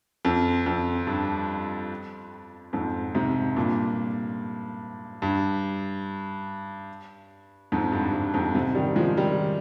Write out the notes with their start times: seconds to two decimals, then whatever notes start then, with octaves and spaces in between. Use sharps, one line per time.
0.25 F2
0.66 F2
1.07 G2
2.73 F2 G#2
3.15 G#2 C3
3.56 G2 A#2
5.22 G2
7.72 F2 G#2
7.92 G2
8.13 G2
8.34 F2 G#2
8.54 G#2 C3
8.75 D#3 G3
8.96 F3 G#3
9.17 D#3 G3